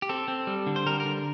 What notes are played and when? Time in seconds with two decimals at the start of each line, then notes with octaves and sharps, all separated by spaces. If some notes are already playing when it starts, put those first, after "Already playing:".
0.02 G4
0.09 C4 A4
0.28 C4
0.47 G3
0.66 D3
0.76 C5
0.87 G3 A#4
1.00 A#4
1.05 D3